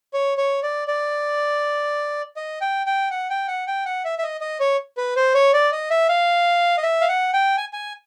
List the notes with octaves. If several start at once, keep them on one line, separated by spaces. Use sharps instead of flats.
C#5
C#5
D5
D5
D#5
G5
G5
F#5
G5
F#5
G5
F#5
E5
E5
D#5
D#5
C#5
B4
C5
C#5
D5
D#5
E5
F5
D#5
E5
F5
F#5
G5
G#5
G#5